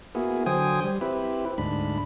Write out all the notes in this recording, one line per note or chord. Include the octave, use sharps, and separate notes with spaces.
A#3 B3 E4 F#4 G#4
D3 F#3 C5 G5 G#5 D#6
G3
C4 E4 G4 B4
D2 G#2 D4 B5